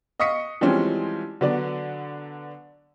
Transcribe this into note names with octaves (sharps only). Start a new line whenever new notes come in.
D#5 F5 C#6 D#6 B6 C#7
E3 F3 G3 G#3 C4 C#4
D3 F#3 B3 D4 D5